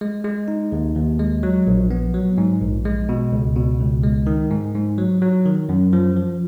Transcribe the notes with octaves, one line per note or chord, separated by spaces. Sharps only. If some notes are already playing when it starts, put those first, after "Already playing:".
G#3
G#3
D#4
D#2
D#2
G#3
F#3
A#1
B3
F#3
G#2
A#1
G#3
B2
C#2
B2
C#2
G#3
D#3
G#2
G#2
F#3
F#3
D#3
F#2
F3
F3